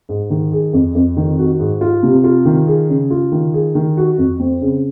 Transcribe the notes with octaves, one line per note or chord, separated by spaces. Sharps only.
G#2
D#3
G#4
F2
F2
D#3
F#4
G#2
F4
C3
F4
D#3
G#4
C#3
F4
D#3
G#4
D#3
F#4
F2
C4
C#3